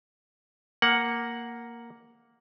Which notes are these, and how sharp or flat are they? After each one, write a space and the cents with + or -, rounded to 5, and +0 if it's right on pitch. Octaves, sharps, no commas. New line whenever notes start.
A#3 +0 F#5 +0